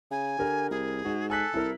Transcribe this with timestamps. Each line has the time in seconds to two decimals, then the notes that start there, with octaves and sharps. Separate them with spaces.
0.11 C#3 G#5
0.39 D3 G4 A#4
0.71 C2 G#4
1.05 G#2 F#4
1.30 A4 G#5 F#6 B6
1.54 C2 E4 A#4